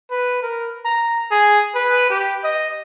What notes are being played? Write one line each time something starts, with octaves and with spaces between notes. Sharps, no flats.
B4
A#4
A#5
G#4
B4
G4
D#5